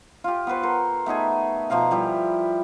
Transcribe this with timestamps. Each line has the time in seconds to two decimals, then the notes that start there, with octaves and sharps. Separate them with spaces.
0.24 F4 G4
0.47 B3 F#4 B4 C5
0.63 A4 A#4 C5
1.06 A3 B3 D#4 G#4
1.70 B2 F3 F5 A#5
1.91 F3 G3 E4